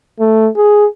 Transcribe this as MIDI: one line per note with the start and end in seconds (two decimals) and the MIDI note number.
0.20 0.48 57
0.57 0.86 68